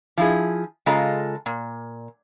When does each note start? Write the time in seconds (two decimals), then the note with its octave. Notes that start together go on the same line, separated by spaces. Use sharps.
0.17 F3 E4 G#4
0.86 C#3 G#3 F4 A4 D#5 A#5
1.46 A#2